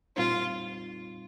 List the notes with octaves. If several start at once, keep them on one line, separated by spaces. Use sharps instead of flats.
A#2 G3 C4 D#4 F4